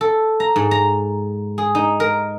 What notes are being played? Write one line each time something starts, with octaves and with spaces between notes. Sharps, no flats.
A4
A#5
G#2
A#5
G#4
D#4
A#4